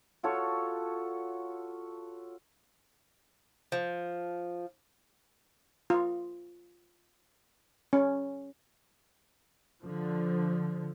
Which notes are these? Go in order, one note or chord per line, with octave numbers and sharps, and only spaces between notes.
F4 F#4 A4 C#5
F3
F4
C#4
D3 F3